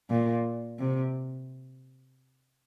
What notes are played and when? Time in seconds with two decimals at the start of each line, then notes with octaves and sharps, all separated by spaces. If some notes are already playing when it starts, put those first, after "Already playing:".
0.10 A#2
0.79 C3